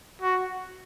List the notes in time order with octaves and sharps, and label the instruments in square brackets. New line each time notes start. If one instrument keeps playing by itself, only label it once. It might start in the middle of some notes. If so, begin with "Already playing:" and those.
[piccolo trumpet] F#4